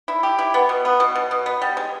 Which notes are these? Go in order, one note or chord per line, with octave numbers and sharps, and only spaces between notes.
E4
G4
E4
B3
B2
B3
B2
B2
B2
B3
G3
G#3